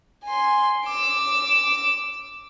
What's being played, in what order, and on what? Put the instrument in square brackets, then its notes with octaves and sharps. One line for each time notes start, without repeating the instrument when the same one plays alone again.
[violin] G#5 C6
D6 E6